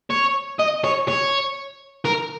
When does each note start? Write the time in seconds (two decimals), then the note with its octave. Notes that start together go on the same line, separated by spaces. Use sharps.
0.10 C#5
0.59 D#5
0.84 C#5
1.08 C#5
2.05 A#4